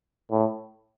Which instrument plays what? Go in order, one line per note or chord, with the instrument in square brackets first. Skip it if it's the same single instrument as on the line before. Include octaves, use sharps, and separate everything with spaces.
[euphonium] A2